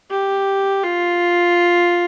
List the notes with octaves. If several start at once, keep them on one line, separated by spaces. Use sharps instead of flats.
G4
F4